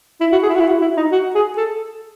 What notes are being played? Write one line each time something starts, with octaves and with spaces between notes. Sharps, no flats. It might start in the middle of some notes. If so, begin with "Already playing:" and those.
E4
F#4
G#4
E4
F#4
E4
F#4
E4
D#4
F#4
G#4
A4